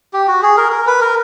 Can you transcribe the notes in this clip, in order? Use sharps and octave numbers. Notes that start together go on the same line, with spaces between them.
G4
F#4
G#4
A#4
A#4
B4
A#4